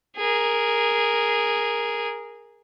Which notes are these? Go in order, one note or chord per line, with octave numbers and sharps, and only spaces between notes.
G#4 A#4